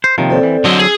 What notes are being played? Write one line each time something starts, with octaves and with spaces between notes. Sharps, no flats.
C5
C3 D#3 F3 A#3 C#5 G5
C4 A4 D5
E3
D3 F#3 C5 D#5 E6
G#4